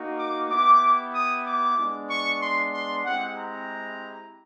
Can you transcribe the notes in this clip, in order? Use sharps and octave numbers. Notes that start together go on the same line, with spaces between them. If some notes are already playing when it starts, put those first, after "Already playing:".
Already playing: A#3 D#4 F#4
D6
B3 E4 G4 D6
D#6
D6
G#3 B3 D4
C#6
C6
C6
G#3 C4 E4 G4 F#5
A#5